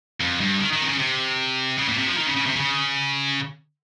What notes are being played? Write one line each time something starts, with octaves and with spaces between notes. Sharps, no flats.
F2
G2
D#3
D#3
C3
C#3
C3
C#3
A#2
C3
F3
D#3
C#3
C#3
C3
C#3